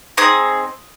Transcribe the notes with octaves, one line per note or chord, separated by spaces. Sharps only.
C4 D#4 G#4 D#6